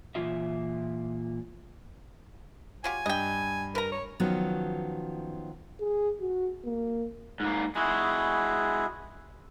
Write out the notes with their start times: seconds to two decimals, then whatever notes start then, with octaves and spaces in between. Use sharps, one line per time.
0.15 A#2 E3 F4 E5
2.84 F#3 F4 G4 G#5
3.06 G2 D#5 G5
3.75 A#4 B4 A#5
3.92 C#5
4.20 D#3 F3 F#3 B3 C#4
5.80 G#4
6.20 F#4
6.65 A#3
7.40 G#2 A#3
7.76 G#3 E4 F#4 G#4